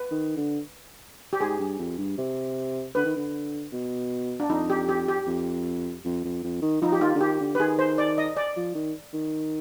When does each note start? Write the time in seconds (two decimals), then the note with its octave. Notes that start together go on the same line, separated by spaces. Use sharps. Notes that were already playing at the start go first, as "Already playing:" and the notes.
Already playing: B4
0.11 D#3
0.37 D3
1.33 G4
1.41 G#2 G#4
1.59 G2
1.79 F2
1.98 G2
2.18 C3
2.95 D3 B4
3.05 D#3
3.16 D3
3.73 B2
4.40 D4
4.50 F2 D#4
4.70 G4
4.89 G4
5.08 G4
5.27 F2
6.05 F2
6.24 F2
6.44 F2
6.62 D#3
6.82 F3 D#4
6.92 G4
7.01 D#3 F4
7.15 D3
7.21 D#3 G4
7.40 D3
7.55 B4
7.59 D#3 G#4
7.79 C5
7.98 D5
8.18 D#5
8.37 D5
8.57 F3
8.75 D#3
9.14 D#3